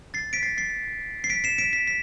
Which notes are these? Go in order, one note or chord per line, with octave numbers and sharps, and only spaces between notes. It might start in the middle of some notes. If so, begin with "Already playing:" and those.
A6 C7
B6 D7
A6 C7
A6 C7
C7
B6 D7
C7 E7
B6 D7
B6 D7
B6